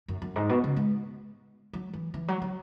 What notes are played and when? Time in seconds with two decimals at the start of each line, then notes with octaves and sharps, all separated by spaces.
0.08 F#2
0.22 F#2
0.36 G#2
0.50 B2
0.64 C#3
0.76 G#3
1.73 F#3
1.94 E3
2.14 E3
2.28 F#3
2.42 F#3